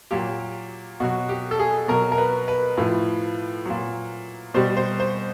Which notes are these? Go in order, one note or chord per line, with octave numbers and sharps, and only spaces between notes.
A#2 F#3 G4
B2 F#3 F#4
G4
A4
G#4
B2 F#3 A#4
A#4
B4
B4
A2 F3
A#2 F#3
B2 G3 C5
C5
C5